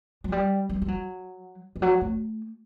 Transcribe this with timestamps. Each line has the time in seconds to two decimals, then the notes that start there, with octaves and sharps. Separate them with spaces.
0.24 F#3
0.32 G3
0.69 G3
0.82 G3
0.88 F#3
1.76 E3
1.82 F#3
2.01 A3